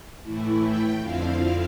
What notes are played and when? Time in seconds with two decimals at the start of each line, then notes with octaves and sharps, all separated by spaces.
0.22 A2 E3 A3 E4
0.60 G5
1.00 F2 D3 F3 C4 E4 F5